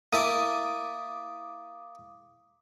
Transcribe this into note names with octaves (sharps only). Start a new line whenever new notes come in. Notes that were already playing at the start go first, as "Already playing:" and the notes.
A#3 E4 A5 D6 D#6